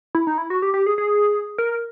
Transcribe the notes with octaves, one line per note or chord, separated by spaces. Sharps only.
E4
D#4
E4
F#4
G4
G4
G#4
G#4
A#4